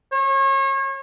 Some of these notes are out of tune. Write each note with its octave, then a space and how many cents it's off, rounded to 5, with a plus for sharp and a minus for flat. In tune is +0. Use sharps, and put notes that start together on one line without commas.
C#5 -35